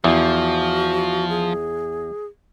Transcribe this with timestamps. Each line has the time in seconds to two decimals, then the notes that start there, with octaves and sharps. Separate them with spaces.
0.04 E2 F3 F#4
1.29 G#4